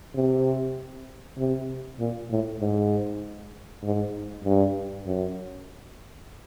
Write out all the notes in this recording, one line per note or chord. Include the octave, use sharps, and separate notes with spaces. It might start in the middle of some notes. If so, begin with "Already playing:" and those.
C3
C3
A#2
A2
G#2
G#2
G2
F#2